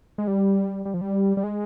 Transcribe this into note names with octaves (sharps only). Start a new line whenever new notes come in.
G#3
G3
G3
F3
G3
G3
G#3